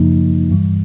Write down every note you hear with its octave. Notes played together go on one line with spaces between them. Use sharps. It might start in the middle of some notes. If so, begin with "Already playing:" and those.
Already playing: F#2 C#3 F3 A#3 D#4
G2 E3 G3